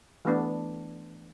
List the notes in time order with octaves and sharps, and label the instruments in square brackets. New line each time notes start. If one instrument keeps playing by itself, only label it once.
[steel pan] E3 A3 B3 D4